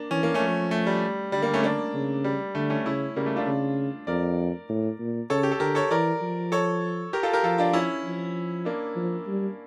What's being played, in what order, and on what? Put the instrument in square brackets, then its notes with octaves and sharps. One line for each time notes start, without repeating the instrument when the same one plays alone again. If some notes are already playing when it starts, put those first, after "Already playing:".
Already playing: [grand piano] A#3 D4
[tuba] E3 [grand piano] C#4
[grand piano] A#3
A3 C#4
[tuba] F3
[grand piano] A3
G3
[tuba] D3 [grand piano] G3
[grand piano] G3 A#3
A3 C#4
A#3 D4
[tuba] C#3
[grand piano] G3
[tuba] D3 [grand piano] A3
[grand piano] A3 C#4
[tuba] C#3 [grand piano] C#4 E4
[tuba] C#3 [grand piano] G3 A#3
[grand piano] A3
D4 F4
[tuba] C#3
[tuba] F2 [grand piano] A#4 D5
[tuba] A2
A#2
[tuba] C#3 [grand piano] A4 C#5
[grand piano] G4
A4
[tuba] D3 [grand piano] G4 A#4
[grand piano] A4 C#5
[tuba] E3 [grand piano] A#4 D5
[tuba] F3
[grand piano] A4 C#5
G4 A#4
F4 A4
G4 A#4
[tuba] F3 [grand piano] F4 A4
[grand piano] D4 F4
C#4 E4
[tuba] F3
[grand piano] A#3 D4
[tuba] F3
G3